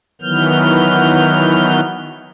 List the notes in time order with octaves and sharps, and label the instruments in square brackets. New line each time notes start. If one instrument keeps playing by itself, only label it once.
[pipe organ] D#3 E3 F#3 B3 F6 G6